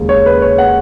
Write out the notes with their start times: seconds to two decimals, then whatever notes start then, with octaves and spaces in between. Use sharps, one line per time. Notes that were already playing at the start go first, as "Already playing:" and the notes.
Already playing: D#2 C#3 G#3
0.09 C#5
0.26 B4
0.42 C#5
0.58 F#5